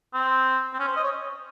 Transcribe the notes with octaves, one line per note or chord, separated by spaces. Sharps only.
C4
C4
C#4
C5
D#5
C#5